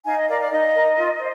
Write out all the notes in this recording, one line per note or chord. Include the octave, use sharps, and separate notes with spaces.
D#4 F5 G#5
D#5
A#4 D5 F5
D5 F5
D#4 D#5
A#4
F4
C5